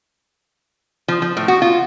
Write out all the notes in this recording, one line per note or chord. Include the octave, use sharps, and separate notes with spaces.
F3
F3
A2
F#4
F4